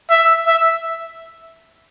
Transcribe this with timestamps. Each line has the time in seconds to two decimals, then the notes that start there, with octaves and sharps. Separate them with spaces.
0.10 E5
0.47 E5